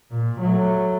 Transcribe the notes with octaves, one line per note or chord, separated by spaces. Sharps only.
A#2
F#3 A3